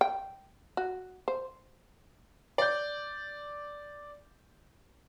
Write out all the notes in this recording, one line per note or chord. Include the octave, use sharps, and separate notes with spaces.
G5
F#4
C5
D5 G6